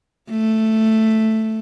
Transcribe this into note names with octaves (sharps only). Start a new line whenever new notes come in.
A3